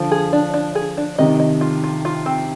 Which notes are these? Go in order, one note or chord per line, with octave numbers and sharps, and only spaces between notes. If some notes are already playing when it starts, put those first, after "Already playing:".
Already playing: D3 F3
G#4
D4
D4
G#4
D4
C3 D#3 D#5
D#5
F4
F4
F4
C4